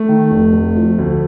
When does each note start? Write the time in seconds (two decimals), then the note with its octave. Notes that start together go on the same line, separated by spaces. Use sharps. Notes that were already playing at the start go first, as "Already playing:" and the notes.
Already playing: A3
0.09 D#3
0.31 F1
0.53 F1
0.76 F3
0.98 D2